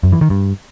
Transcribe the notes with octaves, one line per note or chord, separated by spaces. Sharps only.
F#2
E3
D#3
G2